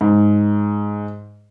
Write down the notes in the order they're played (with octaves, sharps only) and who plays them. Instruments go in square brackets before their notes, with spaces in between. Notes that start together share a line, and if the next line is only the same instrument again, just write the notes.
[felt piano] G#2